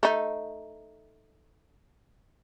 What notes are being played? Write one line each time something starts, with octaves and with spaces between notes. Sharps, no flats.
A3 D#4